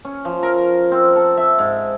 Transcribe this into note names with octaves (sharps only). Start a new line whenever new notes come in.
C#4
F3
A#4
C4
A4
E5
G#2